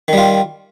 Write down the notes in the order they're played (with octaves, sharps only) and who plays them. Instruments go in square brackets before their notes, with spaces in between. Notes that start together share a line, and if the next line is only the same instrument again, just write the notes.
[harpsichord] D#3
G3
F4